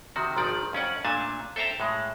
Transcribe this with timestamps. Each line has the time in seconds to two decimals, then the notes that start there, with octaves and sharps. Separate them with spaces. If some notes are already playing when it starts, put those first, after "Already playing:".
0.16 C3 D#3 F#4
0.36 G#1 D#3 F3 D5
0.73 F2 C#4 D5 F#5
1.05 A#2 A3 D4 G#5 A5
1.56 A4 C5 E5 G5 A5 A#5
1.80 A2 G#3